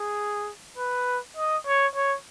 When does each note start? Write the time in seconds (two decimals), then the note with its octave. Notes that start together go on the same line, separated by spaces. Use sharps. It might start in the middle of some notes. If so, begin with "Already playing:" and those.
Already playing: G#4
0.78 B4
1.37 D#5
1.66 C#5
1.95 C#5